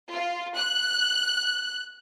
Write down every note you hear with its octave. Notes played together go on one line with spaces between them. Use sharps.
F4
F#6